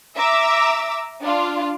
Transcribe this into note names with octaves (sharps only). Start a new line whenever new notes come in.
E5 A#5 D6 E6
D4 F4